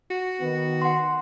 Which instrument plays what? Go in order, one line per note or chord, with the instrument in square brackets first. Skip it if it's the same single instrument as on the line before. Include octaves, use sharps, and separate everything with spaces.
[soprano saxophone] F#4
[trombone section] D#3 B3
[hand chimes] F#5 C6